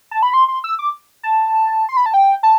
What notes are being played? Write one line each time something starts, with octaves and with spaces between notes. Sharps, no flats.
A5
B5
C6
C6
E6
D6
A5
C6
B5
A5
G5
A5